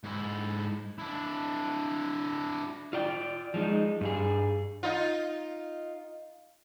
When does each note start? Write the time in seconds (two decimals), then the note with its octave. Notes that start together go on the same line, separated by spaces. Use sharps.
0.04 G#2 E4
0.98 D4 E4
2.93 F4 D5 G5
3.54 F3 G#3 D#4
4.01 G2 G3 G#4
4.83 D#4 F4